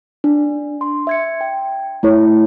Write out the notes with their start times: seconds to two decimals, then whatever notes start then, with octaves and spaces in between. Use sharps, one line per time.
0.24 D4
0.81 C6
1.07 E5 G#6 C#7
1.41 G5
2.03 A3 E4 C#5